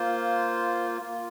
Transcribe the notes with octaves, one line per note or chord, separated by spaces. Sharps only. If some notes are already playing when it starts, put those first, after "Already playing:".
Already playing: A#3 F4 C5
A#3 F4